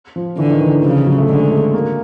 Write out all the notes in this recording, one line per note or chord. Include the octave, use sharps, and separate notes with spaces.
F3
D3 E3
D#3
E3
C#3 F3
F#3
A3
D3 G#3
G#3
A3
A#3